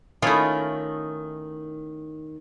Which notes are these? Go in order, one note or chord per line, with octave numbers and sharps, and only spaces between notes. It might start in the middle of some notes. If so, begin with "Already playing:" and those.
D#3 A3 C#4 E4 F4